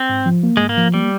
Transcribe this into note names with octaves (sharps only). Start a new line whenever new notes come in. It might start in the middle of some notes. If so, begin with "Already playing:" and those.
Already playing: C4
G#2
F3
A#3
G#2 G#3
A#3
F3
G3 A#3